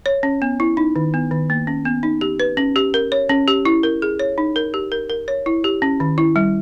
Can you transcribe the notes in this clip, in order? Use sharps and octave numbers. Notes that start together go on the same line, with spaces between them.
C#5
C#4
B3
E4
D#4
D#3
B3
D#3
A#3
C#4
B3
D#4
G4
B4
C#4
G4
A#4
C#5
C#4
G4
E4
A#4
G#4
C#5
D#4
A#4
G4
A#4
A#4
C#5
E4
G4
C#4
D#3
E4
G3